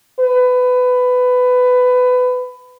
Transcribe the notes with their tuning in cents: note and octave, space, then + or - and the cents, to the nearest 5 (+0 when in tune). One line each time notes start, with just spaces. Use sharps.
B4 +20